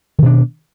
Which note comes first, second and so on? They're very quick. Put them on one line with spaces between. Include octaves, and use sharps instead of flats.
D#3 B2 D4